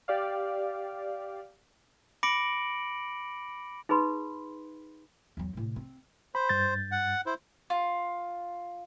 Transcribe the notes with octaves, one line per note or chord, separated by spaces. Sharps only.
G4 D5 F5
B5 D6 A#6 C#7 D7 F#7
D#4 G#4 B4 B5 C6
E2 F#3
A2 C3
C4
C5 B5
G2 G6 A6
F#5
E4 C5
F4